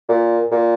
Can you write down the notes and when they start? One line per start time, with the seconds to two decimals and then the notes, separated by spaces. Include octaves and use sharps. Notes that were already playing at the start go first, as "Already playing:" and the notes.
0.09 A#2
0.52 A#2